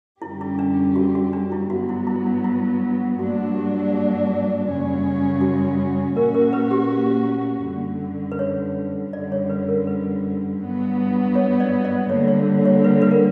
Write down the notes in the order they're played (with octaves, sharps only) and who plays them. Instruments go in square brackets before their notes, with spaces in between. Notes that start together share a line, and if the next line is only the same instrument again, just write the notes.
[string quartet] F#2 D3 G3 C#4 G4 [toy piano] E4
[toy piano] E4
D4
F#4
F#4
D4
E4
[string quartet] G2 F#3 B3 [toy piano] F#4
[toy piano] E4
E4
D4
E4
[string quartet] G2 F#3 A#3 D4 [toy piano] F#4
[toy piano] G4
[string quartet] F#2 C#3 G3 C#4
[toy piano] F#4
[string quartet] A#2 A#3 C#4 F#4 [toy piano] A#4
[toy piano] A#4
B4
G4
[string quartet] F#2 D3 G3
[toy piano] B4
C#5
[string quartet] F#2 D3 G3 [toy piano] D5
[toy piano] C#5
B4
A#4
B4
[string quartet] G2 F#3 B3
[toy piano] C#5
D5
D5
[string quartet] D3 G3 A#3 [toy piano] C#5
[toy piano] C#5
C#5
B4
B4
A#4